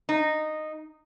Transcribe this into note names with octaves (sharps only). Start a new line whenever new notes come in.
D#4